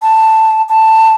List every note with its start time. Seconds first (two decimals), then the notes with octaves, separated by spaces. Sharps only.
0.02 A5
0.69 A5